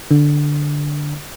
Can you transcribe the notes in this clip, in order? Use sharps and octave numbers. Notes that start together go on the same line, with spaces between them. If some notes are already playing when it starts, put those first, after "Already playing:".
D3